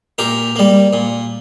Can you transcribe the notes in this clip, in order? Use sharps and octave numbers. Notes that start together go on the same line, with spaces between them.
A#2 G4 A#4
G3 A#3
A#2